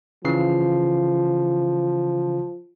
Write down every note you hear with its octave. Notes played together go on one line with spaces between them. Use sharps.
C#3 E3 F3 C7